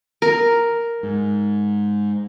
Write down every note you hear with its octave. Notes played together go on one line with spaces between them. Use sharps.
A#4
G#2